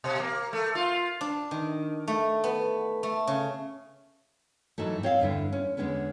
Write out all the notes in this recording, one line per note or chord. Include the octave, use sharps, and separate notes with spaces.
B2
A#3
A3
F4
D4
D#3
A3
B3
A3
C#3
G#2 E3 F#3 A3
C4 C#5 D#5 F5
E2 G2 D3 E4
C#4
E2 A2 D3 G#3 B3 C#4